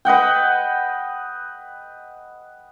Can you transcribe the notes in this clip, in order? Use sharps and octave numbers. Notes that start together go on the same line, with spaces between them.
B4 D#5 F#5 G5